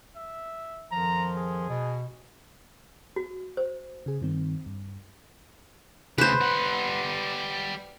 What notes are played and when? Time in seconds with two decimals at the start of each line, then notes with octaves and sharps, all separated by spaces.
0.16 E5
0.92 F2 D#3 F3 A#5
1.36 G#4
1.69 B2
3.16 F#4
3.57 C5
4.06 C#3 G#4
4.21 G2 D#3 C4
4.66 G2
6.18 D2 C#3 B4 C5
6.41 G3 F#5